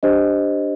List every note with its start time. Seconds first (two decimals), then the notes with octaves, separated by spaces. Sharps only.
0.03 D4 G4 C5 D#5